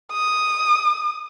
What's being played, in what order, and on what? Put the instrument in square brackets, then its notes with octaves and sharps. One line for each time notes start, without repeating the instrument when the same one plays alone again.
[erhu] D#6